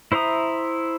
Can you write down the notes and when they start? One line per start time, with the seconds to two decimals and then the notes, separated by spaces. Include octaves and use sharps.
0.12 E4 C5 E5 A#5 D#6